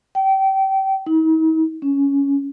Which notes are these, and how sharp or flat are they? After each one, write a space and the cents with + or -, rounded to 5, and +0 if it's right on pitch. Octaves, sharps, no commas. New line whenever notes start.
G5 -25
D#4 +45
C#4 +10